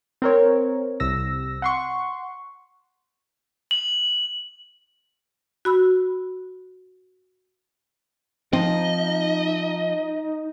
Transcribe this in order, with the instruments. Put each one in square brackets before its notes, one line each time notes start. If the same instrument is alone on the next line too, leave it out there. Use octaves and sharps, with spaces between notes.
[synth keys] C4 A#4 C#5
C2 C3 E6 A#6
F#5 C6 C#6
[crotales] F#7
[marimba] F#4 B5 E6
[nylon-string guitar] F3 [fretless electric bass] C4 [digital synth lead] D#4 [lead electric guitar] D#5